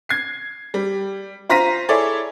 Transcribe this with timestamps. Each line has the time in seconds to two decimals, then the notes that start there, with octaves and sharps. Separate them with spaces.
0.09 G#6 C7
0.74 G3
1.49 F4 C5 A#5 A#6 B6 D#7
1.88 E4 G#4 A4 C#5 D5